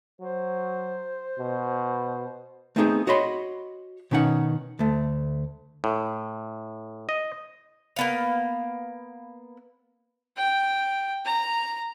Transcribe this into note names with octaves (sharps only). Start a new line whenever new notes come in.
F#3 C5
B2
A3 B3 C4 D#4 G4 G#4
F#4 C#5 D#5 B5 C6
B2 D#3 C#4 D#4 F#5
D2 A3
A2
D#5
A#3 B3 F5
G5
A#5